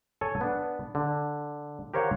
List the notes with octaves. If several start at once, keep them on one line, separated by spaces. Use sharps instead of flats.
A4 C#5 G#5
B3 D4
D3
G4 A#4 C5 C#5 F5 F#5